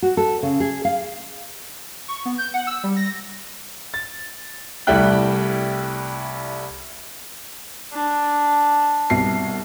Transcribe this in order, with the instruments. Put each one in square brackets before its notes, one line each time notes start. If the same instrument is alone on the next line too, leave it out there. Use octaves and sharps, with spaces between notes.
[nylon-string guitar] F#4
A4
C#3
G#4
F5
[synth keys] C#6
B3
G6
F#5
E6
G3
A#6
[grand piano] A6
C2 G3 A3 E4 G5 F#6
[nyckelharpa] D4
[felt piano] C2 B2 C7